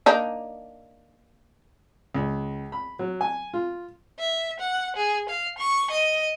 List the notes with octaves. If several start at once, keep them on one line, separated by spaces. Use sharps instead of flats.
A#3 D4 D#4
C#2
B5
F#3
G#5
F4
E5
F#5
G#4
F5
C#6
D#5